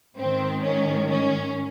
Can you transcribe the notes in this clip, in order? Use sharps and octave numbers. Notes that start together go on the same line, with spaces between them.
G#2 D#3 C4
C#4
C#4